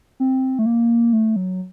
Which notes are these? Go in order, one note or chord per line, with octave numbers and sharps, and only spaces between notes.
C4
A3
A#3
A3
F#3